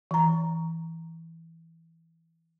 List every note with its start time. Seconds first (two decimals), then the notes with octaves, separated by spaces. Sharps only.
0.11 E3 A#5